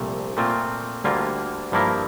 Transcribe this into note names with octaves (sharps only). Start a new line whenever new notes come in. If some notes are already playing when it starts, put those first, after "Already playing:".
Already playing: C2 A#2 F3 A3 C4
A#2 A3 C4 F4
D2 D3 G3 A#3 F4
G2 F3 A#3 E4 A#4